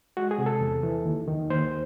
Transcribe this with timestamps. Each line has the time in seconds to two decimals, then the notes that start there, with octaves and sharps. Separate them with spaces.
0.17 G#3 F#4
0.31 G#4
0.38 C3
0.46 A4
0.61 E2
0.83 E3
1.05 D#2
1.28 D#3
1.50 D#2 C5